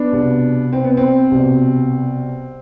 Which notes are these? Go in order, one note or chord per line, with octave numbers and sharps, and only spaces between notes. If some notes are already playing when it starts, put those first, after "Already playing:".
Already playing: B3 D4
C2 B2
C4
B3
C4
C2 B2